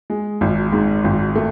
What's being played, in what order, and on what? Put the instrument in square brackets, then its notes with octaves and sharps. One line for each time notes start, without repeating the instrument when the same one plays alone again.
[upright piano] G#3
G#1
G#2
G#1
A3